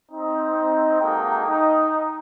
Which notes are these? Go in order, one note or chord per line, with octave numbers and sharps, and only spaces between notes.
C4 D#4
G#3 A#3 D#4 F#4 A4 G5
D#4